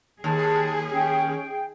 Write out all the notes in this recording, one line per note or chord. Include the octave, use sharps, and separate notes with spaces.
D#2 G#4 A5
C#4 G5